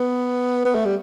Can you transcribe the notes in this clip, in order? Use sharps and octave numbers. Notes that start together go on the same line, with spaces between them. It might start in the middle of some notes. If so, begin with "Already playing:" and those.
Already playing: B3
B3
A3
G3